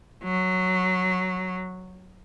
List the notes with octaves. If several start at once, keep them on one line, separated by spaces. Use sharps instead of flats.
F#3